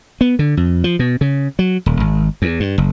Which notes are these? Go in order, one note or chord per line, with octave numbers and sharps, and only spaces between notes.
B3
D3
F2
F3
B2
C#3
F#3
D#1
G#1
E2
G2
F#1